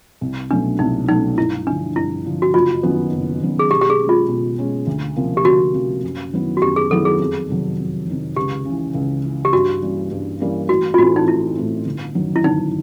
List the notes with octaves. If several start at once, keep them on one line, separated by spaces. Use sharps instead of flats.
C2
B2 F#3 A3 C#4 D4
C2 D#4
B2 F#3 A3 C#4 D#4
G2 E4
D3 F3 D4
G2 E4
D3 F3
F#4
F#1 F4
F#2 D#3 F#3 B3
F#1
F#2 D#3 F#3 B3
G#4
B2 G4
G4
G#4
G#3 C#4
F4
B2
G#3 C#4
D2
C3 F3 A#3 C#4
G4
D2 F#4
C3 F3 A#3 C#4
F#2
D#3 F#3 B3 E4
F#4
F#2 G4
G#4
D#3 F#3 B3 E4 A4
G#4
F2
C3 D#3 F#3
F2
C3 D#3 F#3
C#2 G4
C#3 E3
C#2
C#3 E3
G4
G2 F#4
E3 G3 A#3 C#4
G2
E3 G3 A#3 C#4
A1 F#4
F4
A2 E3 A3 C4 F#4
D#4
A1 E4
A2 E3 A3 C4
G1
F#2 D#3 F#3
E4
G1 D#4